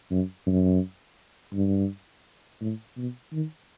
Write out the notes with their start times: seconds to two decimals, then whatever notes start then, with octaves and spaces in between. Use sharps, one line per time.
0.11 F#2
0.47 F#2
1.54 G2
2.61 A2
2.97 B2
3.33 D#3